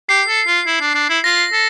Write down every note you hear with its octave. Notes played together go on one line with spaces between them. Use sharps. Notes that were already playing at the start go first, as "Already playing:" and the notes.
G4 C7
A4
F4
E4
D4
D4
E4
F4 A#6
A4